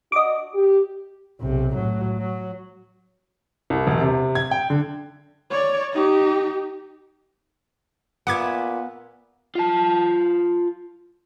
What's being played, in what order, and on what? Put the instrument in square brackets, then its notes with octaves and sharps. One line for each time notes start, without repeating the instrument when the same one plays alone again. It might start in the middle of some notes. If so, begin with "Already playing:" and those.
[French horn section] D4 F#4 [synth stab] D#5 D6
[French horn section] G4
[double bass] B1 C3
A2 F#3
F#3
[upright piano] C2
E1
C3
G#6
G5
D3
[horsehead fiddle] C#5 D5
D#4 G4
[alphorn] A#2 [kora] B3 B4 E5 [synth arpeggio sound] F#5 D6 G#6
[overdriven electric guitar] F4 A5